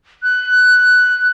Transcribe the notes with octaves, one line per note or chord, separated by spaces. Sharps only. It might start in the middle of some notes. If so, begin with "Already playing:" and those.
F#6